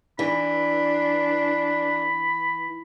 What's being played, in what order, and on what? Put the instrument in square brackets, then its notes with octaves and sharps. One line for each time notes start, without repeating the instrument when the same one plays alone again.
[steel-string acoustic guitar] E3 [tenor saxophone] D4 [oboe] B5